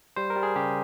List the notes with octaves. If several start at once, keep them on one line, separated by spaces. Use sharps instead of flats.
G3 C5
A#4
G3
G#4
C#3 G4